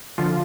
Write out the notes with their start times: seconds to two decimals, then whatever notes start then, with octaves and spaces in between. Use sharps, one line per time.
0.18 D3 F3 F4